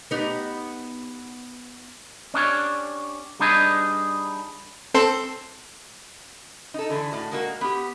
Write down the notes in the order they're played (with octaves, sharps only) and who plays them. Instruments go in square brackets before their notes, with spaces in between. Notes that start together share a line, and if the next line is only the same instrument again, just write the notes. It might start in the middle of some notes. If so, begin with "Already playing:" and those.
[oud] B3 D#4 G4
[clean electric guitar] C#4 D4 G4 C#5
G3 D4 D#4 G#4 B4
[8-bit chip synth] C4 A4 C6
[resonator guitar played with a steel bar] D#4 A4
D3 E3 E4 G#4
A2 F#4
G#3 A#3 F#4
B3 G4